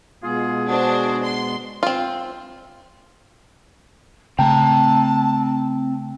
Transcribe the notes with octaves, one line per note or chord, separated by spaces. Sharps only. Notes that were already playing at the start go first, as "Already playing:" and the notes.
B2 G#3 B3 F4 G#4
D4 F#4 G#4 C5
C6
C4 F4
C#3 A3 C4 G5 A5 A#5